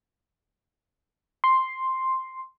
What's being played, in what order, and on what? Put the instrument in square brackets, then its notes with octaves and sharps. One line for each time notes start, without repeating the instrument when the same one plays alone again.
[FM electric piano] C6